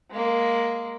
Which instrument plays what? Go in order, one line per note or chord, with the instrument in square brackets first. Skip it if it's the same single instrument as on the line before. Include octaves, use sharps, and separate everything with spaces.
[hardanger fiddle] G#3 A#3